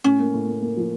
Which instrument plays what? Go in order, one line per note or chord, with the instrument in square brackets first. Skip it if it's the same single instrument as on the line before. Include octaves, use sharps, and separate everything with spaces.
[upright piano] A2 [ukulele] C#4
[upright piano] A#3
A2
A#3
A#3
F3